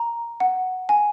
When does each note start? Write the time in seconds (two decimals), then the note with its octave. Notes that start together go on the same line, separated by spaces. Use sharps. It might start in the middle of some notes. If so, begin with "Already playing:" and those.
Already playing: A#5
0.40 F#5
0.89 G#5